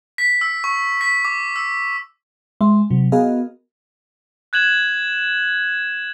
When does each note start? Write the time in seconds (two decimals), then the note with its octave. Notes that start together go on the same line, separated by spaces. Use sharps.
0.18 B6
0.41 E6
0.64 C#6
1.01 B6
1.25 D6
1.56 E6
2.61 G#3 E5 C6
2.90 C3 F#3
3.12 B3 F#4 G#4 A#4 D#5 F5
4.53 F#6 G#6 E7 F#7